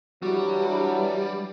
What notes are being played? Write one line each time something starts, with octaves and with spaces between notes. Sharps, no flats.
E3 F#3 G3 D4 F#4